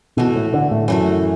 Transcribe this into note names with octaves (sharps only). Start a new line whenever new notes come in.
B2 E3 A3 F#4
A2
D3
A2
F#2 E3 A3 F#4